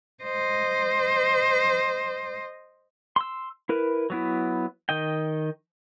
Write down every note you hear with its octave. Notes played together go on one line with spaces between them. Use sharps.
C5 D#5
C6 E6
E4 A#4 B4
F#3 B3 E4
D#3 D#5 G5